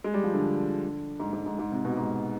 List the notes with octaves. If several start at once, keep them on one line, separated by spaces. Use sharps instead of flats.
G#3
G3
F3
D3
G#2
G#2
G#2
G#2
C3
B2
G#2